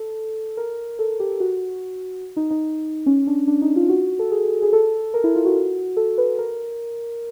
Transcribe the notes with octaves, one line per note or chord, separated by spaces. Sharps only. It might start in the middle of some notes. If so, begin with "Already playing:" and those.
Already playing: A4
A#4
A4
G4
F#4
D#4
D#4
C#4
D4
D4
D#4
F4
F#4
A4
G#4
G#4
A4
A#4
E4
F4
F#4
A4
B4
A#4